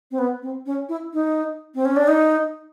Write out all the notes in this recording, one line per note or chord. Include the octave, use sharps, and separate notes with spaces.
C4
B3
C4
C#4
E4
D#4
C4
C#4
D4
D#4